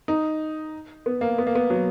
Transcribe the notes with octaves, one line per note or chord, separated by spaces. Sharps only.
D#4
B3
A#3
B3
A#3
B3
F#3